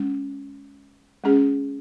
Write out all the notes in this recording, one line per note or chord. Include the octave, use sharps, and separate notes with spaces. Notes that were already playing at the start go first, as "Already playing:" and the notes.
Already playing: G#3 C#4
G#3 C#4 G#4